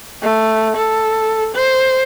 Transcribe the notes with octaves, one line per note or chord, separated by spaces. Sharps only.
A3
A4
C5